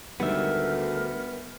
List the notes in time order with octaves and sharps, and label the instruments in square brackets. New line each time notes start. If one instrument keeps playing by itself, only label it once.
[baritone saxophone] D2 [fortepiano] G#2 D#3 G3 [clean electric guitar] B3 E5 [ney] A#4